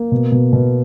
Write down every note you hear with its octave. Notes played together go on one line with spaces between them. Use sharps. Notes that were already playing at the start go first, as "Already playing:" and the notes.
Already playing: A#3
B2
B2
B2